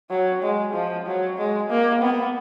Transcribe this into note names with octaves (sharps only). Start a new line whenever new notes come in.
F#3
G#3
F3
F#3
G#3
A#3
B3